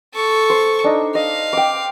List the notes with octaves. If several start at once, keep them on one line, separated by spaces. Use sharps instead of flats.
A4 C#6
C5
D4 D#4
D#5 F5
G5 D6